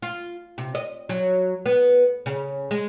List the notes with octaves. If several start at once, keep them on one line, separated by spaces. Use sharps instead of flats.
F4
C3
D#5
F#3
B3
C#3
G#3